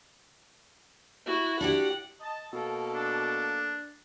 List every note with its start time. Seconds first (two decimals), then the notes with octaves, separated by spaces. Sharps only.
1.26 E4 F#4
1.61 D4 F#4 G4 F#5
2.20 D#5 A5
2.53 B2 A#3 A4
2.93 D4